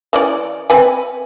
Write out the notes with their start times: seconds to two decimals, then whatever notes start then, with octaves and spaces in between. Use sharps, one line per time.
0.13 E3 C#4 D5
0.70 C4 B4 G#5